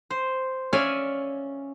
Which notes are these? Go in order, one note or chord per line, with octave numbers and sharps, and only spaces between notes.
C5
C#4 C#5 D5 E5 F5 G#5